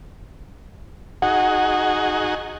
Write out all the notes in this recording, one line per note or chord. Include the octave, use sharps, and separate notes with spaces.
D#4 F#4 G#4 F#5